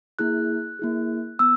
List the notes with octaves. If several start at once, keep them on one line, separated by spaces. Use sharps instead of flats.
A#3 E4 G#4 F#6
A#3 E4 G#4
B3 E6